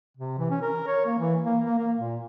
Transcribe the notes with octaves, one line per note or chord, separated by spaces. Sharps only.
C3
E3
C#4
A#4
C#5
A#3
E3
A#3
A#3
A#3
A#2